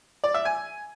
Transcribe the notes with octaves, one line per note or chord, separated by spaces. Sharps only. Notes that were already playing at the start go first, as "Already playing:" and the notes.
D5
E5
G#5